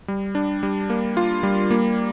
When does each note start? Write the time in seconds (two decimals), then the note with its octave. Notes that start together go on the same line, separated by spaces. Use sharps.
0.08 G3
0.35 D4
0.63 G3
0.90 A#3
1.17 F4
1.43 G3
1.71 A#3